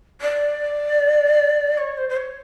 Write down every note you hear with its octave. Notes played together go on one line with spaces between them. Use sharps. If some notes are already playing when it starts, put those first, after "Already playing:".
D5
C#5
C5
C5
C#5